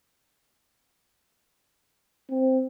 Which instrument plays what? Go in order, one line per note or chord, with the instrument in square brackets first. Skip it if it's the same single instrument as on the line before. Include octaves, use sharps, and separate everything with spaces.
[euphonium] C4